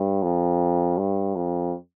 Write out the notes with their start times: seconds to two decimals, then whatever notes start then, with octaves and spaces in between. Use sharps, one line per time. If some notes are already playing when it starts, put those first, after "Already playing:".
Already playing: G2
0.23 F2
0.98 G2
1.35 F2